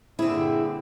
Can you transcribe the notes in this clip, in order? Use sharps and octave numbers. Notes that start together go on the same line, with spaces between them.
G2 A#2 D3 C4 E4 G#4